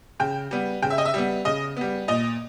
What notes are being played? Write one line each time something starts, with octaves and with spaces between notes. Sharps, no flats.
C#3 G5
G3 B3
C#3 G5
E5
D#5
E5
G3 B3
C#3 D#5
G3 B3
A#2 D#5